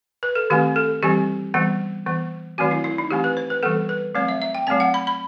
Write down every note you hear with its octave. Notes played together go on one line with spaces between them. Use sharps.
B4
A4
D#3 A3 C4 G4
A4
E3 G3 C4 G4
E3 G3 B3
E3 B3
D#3 F#3 A3 C4 F#4
E4
E4
D#4
E3 A3 C4 G4
B4
C5
B4
E3 G3 B3 A4
B4
F#3 A3 C4 C5
E5
E5
G5
F#3 A3 C4 A5
F#5
B5
B5